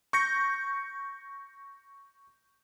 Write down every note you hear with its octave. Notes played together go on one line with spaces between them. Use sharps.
C#6 G6 A#6 C#7